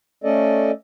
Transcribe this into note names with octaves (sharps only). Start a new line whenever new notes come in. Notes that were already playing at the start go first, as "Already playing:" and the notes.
A3 C#4 A4 D5 D#5